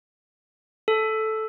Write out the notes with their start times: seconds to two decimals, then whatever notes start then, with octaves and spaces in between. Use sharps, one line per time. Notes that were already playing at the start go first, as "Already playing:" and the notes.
0.88 A4